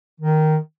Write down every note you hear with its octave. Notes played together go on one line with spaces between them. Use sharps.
D#3